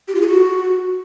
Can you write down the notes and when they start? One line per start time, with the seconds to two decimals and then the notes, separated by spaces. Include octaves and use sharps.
0.08 G4
0.15 F4
0.21 G#4
0.28 F#4